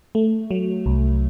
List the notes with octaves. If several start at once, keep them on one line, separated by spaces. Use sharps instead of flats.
A3
F#3
C2